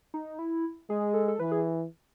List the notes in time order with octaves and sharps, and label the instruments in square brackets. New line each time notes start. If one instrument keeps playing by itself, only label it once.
[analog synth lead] D#4
E4
[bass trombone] G#3 [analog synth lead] G#4
[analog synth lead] A4
A4
[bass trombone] E3 [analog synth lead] B4
[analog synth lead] G#4